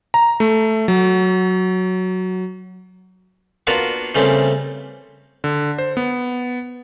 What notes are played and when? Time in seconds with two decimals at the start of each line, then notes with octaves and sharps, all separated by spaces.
0.14 A#5
0.40 A3
0.88 F#3
3.67 A#3 B3 D4 F4 F#4 A#4
4.15 C#3 E3 G3 A3 A#3 C4
5.44 D3
5.78 C5
5.97 B3